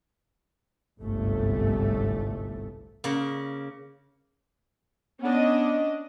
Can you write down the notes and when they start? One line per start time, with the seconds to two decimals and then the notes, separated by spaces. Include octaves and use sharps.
1.01 G1 C2 G#2 A3
3.04 C#3 A#3
5.23 B3 C#4 D4 D#5